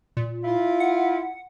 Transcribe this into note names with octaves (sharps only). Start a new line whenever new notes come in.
A#2
E4 F4
F#5